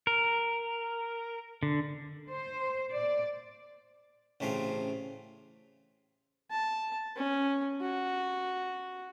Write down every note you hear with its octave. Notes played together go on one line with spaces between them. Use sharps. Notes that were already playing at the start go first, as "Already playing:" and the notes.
A#4
D3
C5
D5
A1 C#3 A3 C4 F4
A5
C#4
F#4